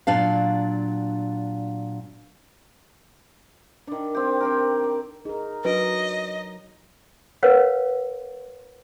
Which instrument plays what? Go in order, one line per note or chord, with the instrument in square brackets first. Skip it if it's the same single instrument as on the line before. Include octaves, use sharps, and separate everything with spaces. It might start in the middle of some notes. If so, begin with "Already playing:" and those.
[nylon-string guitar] A#2 F#3 D4 F5
[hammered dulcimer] D#3 D4
C4 G4
C4 G4 A#4
D5
[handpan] D#4 A#4 [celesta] G#4
[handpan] F#3 D#4 [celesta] D4 F#4 D7 [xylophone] B4 [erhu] D#5
[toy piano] A#4 B4 C#5 F5 F#5